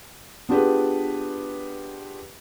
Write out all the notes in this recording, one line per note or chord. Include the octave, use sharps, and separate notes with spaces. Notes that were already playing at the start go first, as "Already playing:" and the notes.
B3 D4 F4 G4 G#4 B4